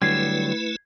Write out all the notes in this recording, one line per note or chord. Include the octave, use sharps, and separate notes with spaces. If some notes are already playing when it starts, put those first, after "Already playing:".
D3 F#3 G3 A3 E4 B4 G#6 C7